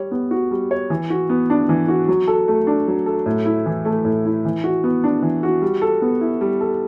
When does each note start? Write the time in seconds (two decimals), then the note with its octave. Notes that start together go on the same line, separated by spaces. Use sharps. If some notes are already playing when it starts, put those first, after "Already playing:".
Already playing: G3 C#5
0.11 B3
0.31 F#4
0.51 G3
0.71 C#5
0.90 E3
1.10 F#4
1.30 B3
1.50 D4
1.69 E3
1.88 F#4
2.08 F#3
2.28 A4
2.48 A3
2.67 D4
2.88 F#3
3.06 A4
3.26 A2
3.46 E4
3.66 E3
3.85 A3
4.05 A2
4.25 E4
4.45 E3
4.64 F#4
4.84 B3
5.04 D4
5.22 E3
5.43 F#4
5.62 G3
5.82 A4
6.02 B3
6.21 E4
6.41 G3
6.61 A4